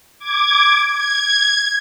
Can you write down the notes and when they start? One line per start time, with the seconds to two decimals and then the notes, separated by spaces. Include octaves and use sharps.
0.19 D6 G#6
0.94 G#6